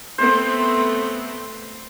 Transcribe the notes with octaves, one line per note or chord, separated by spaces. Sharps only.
A3 B3 C4 C5